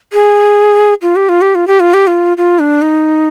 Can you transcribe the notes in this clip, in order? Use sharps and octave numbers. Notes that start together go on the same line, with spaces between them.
G#4
F4
G4
F4
G4
F4
G4
F4
G4
F4
F4
D4
D#4